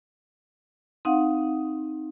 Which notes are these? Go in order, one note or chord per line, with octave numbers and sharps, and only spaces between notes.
C4 D#4 F5 F#5